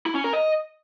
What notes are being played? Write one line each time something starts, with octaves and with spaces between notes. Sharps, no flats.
E4
C#4
A#4
D#5